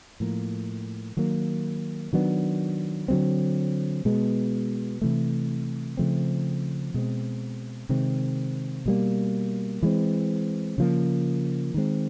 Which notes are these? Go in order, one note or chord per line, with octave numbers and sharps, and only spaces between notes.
A2 F3 A#3
D#3 F#3 A#3
D#3 F#3 B3 D4
D3 F#3 A3 C4
B2 G#3 B3
C3 E3 A3
C#3 F3 A3 C4
B2 G#3 C4
C3 D#3 G#3 C4
B2 G3 A#3
E3 G#3 C4
C#3 F3 A#3
D#3 G#3 C4